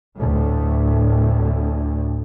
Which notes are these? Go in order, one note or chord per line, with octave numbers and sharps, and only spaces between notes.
D2 A2